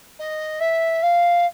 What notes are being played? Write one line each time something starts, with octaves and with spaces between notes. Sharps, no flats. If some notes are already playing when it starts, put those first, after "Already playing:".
D#5
E5
F5